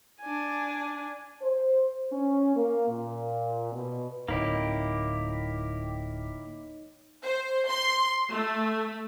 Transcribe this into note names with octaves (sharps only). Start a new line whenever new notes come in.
D4 G#5
C5
C#4
A#3
A#2
B2
D1 A#3 D#4 E4 G4 C#5 D#5
C5
C6
A3